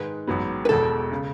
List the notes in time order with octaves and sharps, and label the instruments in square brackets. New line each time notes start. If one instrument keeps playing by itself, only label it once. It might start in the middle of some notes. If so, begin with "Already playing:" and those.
Already playing: [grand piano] G#2 D#3 G#3 D#4 [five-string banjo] B4
[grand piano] A1 G#2 F#3 B3
[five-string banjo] B4
[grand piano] E1 E2 B2 G#3 [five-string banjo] A4
[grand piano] C#3